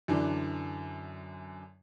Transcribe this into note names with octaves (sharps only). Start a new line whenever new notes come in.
F#2 D3 E3 D4